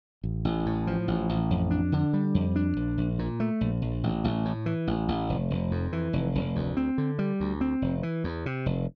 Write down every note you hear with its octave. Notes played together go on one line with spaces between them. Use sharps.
A1
A1
A2
F3
A1
A1
F2
D4
D3
G3
F2
D4
A#1
A#1
A#2
A3
A#1
A#1
A1
A1
A2
E3
A1
A1
F1
F1
F2
E3
F1
F1
D2
C4
D3
G3
D2
C4
F1
E3
E2
C3
F1